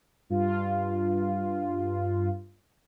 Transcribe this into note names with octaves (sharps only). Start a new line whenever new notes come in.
G2 F4